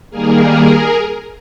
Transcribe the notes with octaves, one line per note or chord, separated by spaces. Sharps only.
D#3 G3 A#3 G#4 A#4